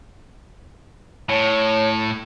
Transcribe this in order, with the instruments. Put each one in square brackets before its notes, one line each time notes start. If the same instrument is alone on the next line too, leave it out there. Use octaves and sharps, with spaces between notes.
[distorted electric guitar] A2 [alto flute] C#5